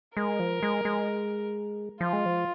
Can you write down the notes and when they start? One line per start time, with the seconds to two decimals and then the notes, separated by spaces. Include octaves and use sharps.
0.16 G#3 A#4
0.40 F3
0.63 G#3
0.85 G#3
2.01 F3 F4
2.13 G#3
2.26 F3